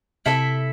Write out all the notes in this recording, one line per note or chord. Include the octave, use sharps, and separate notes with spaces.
C3 E4 A4 E5